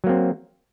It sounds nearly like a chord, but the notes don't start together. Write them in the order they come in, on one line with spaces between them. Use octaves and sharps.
F#3 A#3 C4